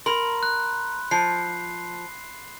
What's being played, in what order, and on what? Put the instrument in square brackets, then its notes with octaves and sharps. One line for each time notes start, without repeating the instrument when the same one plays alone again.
[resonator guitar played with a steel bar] A#4 [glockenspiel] B5 C6
[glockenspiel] F#6
[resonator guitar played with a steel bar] F3 [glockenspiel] C7